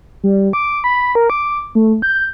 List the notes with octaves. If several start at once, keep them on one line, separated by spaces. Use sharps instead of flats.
G3
D6
B5
A#4
D6
A3
G6